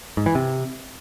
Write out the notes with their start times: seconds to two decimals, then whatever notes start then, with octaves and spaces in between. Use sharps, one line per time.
0.17 G#2
0.26 E3
0.35 C3